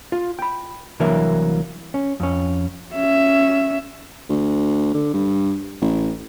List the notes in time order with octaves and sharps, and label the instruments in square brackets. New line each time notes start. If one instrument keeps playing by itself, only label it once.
[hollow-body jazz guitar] F4
G5 B5
C2 E3 F#3 A#3 D4 E5
C#4
F2 C#4
[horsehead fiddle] C#4 E5
[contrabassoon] D2
D3
G2
A1